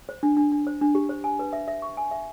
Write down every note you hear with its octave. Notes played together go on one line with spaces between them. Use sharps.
C5
D4
D4
D4
C5
D4
G4
C5
G#5
B4
E5
E5
C#6
G#5
E5